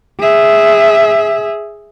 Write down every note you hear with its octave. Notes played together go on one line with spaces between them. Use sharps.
G#4 E5